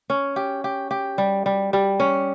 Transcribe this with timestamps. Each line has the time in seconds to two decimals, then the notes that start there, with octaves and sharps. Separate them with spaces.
0.10 C#4
0.36 G4
0.64 G4
0.91 G4
1.18 G3
1.46 G3
1.73 G3
2.00 C#4